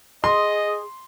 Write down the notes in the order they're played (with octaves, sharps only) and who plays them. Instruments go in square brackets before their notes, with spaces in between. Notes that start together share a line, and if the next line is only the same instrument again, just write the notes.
[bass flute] G#4 [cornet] D#5 [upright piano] C6